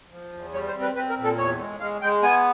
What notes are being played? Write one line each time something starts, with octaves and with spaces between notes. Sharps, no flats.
F3
E2
G3 C#5
C5
C4
B4
C4 B4
A#4
A#2
A4
E2 C#5
G#3
G#3 F5
G#3 G5
B3 G#5